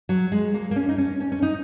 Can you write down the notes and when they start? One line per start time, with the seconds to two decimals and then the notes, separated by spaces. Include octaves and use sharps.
0.09 F#3
0.32 G#3
0.54 A#3
0.71 A#3
0.76 C#4
0.89 D#4
0.98 C#4
1.20 C#4
1.32 C#4
1.42 D#4